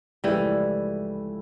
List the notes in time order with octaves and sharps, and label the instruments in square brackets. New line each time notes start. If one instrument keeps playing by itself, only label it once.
[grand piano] C#2 C#3 F3 A3 E4 [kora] E3 G3